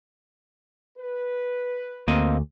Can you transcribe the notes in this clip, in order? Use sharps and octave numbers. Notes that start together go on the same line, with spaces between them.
B4
D2 A#3 C4 D#5